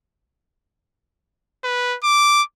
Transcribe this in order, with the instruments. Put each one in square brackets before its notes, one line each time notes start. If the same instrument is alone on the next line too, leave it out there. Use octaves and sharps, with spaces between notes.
[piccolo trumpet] B4
D6